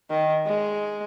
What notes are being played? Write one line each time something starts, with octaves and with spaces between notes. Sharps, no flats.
D#3
G#3